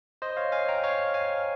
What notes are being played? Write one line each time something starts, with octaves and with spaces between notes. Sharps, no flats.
C5 D#5
C#5 F5
F5 G#5
G5 A#5
C#5 F5
F5 G#5